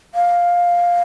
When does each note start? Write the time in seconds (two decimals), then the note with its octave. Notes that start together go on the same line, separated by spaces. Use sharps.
0.15 F5